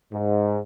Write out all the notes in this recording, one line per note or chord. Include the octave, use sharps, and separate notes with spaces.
G#2